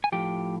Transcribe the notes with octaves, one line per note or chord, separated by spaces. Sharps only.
G#5
A2 F3 G4 G5